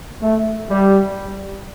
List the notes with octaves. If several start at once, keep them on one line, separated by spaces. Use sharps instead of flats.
A3
G3